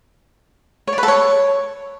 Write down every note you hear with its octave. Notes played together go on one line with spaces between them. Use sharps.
C#5
D5
B4
A4
C#5